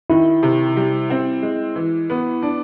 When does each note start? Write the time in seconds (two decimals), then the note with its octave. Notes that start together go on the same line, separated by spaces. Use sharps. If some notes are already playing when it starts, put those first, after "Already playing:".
0.10 D#3 E4
0.43 C3
0.77 G3
1.10 C4
1.42 G#3
1.76 E3
2.10 B3
2.42 D4